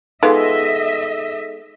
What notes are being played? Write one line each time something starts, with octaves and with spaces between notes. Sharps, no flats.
G#3 B3 D#4 F4 G#4 A4 D#5 E5